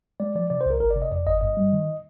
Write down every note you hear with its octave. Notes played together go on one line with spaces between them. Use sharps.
G#3 D5
F3 D5
C3 D5
C5
C2 A#4
G1 A#4
D5
C3
D#5
F2 D5
G1 D#5
G2 D#5
G3
D#3